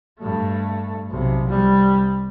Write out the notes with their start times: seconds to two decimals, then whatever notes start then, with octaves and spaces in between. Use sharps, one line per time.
0.20 G2 A3
1.10 B1 C3
1.45 C2 G3